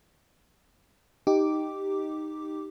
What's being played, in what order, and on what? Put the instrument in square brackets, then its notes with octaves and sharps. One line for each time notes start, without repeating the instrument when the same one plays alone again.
[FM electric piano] D#4 G4 D6